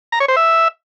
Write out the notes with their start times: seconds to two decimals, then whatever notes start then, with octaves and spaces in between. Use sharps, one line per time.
0.12 A#5
0.20 C#5
0.28 C5
0.36 E5